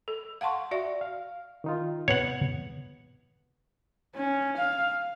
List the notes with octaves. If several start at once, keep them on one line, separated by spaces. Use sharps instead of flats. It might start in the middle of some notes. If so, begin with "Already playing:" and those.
A4
F5 F#5 A5 C6 C#6
F#4 D5 E5
F5
D#3 D#4 F4
C3 B3 C#5 F#5
C#4
F5